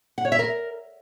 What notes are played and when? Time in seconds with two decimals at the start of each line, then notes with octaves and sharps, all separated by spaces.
0.18 F#5
0.25 C#5
0.32 E5
0.39 A#4